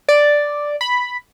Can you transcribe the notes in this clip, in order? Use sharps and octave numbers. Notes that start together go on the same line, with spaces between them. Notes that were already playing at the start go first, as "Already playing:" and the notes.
D5
B5